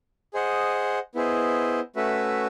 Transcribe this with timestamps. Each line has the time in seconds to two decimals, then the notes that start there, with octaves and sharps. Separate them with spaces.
0.34 G#4 C5 D#5 F#5
1.15 B3 E4 G#4 C5 D#5
1.96 A3 C#4 F#4 B4 E5